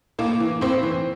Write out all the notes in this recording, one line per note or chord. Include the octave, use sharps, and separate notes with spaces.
A2 A#3
E3
A2 C4
E3